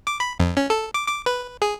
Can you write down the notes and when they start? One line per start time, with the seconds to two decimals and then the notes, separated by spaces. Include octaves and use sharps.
0.07 D6
0.20 B5
0.39 F2
0.57 C#4
0.70 A4
0.94 D6
1.08 D6
1.26 B4
1.62 G#4